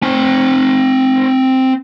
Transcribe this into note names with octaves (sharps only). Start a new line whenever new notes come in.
C4 G#5